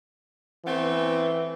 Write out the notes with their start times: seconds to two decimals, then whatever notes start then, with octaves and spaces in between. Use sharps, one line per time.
0.65 E3 A3 B3 C4